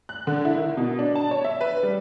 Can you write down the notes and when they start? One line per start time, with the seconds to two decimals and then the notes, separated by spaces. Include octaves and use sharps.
0.09 F#6
0.27 D3
0.45 E4
0.58 D#3
0.77 B2
0.99 D4
1.15 A5
1.31 C#5
1.44 E5
1.61 B4
1.83 G3